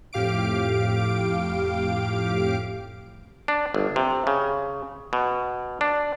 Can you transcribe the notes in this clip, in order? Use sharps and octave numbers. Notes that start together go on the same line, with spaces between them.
F2 A2 G4 F5 D6 D7
D4
G1
C3
C#3
B2
D4